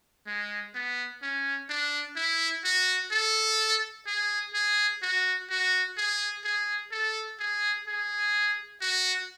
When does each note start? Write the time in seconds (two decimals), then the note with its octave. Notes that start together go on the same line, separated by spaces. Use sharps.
0.27 G#3
0.74 B3
1.23 C#4
1.69 D4
2.16 E4
2.64 F#4
3.11 A4
4.07 G#4
4.54 G#4
5.02 F#4
5.50 F#4
5.97 G#4
6.44 G#4
6.92 A4
7.40 G#4
7.87 G#4
8.81 F#4